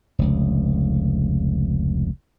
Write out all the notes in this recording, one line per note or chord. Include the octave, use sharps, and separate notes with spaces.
F1 C#2